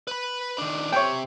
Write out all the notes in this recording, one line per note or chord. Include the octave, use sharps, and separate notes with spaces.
B4 B5
D#3 D4
C3 C#5 G5